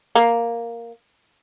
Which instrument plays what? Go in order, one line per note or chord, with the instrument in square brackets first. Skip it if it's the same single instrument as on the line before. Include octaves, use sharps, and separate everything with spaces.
[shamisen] A#3